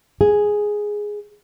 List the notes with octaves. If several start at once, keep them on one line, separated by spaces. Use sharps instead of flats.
G#4